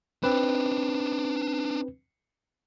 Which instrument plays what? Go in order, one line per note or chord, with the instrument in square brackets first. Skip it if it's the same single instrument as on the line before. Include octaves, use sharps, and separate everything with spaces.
[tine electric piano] C4 B4 [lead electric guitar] D4 D#4